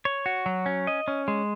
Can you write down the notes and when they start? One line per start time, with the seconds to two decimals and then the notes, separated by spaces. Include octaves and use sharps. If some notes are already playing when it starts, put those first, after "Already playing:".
0.05 C#5
0.26 F#4
0.46 F#3
0.66 C#4
0.87 D#5
1.08 C#4
1.28 G#3